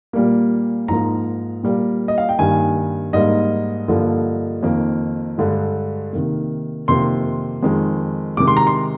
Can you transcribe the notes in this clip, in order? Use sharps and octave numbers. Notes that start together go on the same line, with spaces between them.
A#2 G3 A#3
G#2 F3 A#3 A#5
A#2 G3 A#3
D#5
F5
G5
G2 D#3 G3 A#3 G#5
G#2 G3 A#3 D#5
G2 D3 F3 A#3
F2 D#3 A#3
G2 D3 G#3
C3 D#3 A#3
F2 C3 D#3 A#3 C6
F2 D#3 G#3
C3 D#3 G#3 D6
C6
A#5
C6